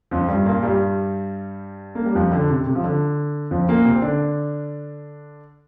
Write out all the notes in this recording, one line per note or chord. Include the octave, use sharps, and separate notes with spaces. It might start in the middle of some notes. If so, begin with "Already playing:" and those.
F2 F3
G2 G3
A#2 A#3
G2 G3
A#3
G3
F2 F3
D3
C3
C3
F3
D3
F2 F3
A#2 A#3
C3 C4
D3 D4